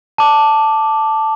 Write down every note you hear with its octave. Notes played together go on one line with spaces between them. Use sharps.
A5 D6